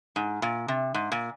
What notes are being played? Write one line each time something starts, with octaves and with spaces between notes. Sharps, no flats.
G#2
A#2
C3
G#2
A#2